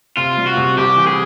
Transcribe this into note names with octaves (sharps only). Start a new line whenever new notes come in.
C3 F4
G3
F#4
C3
C2 G4
E3
G#4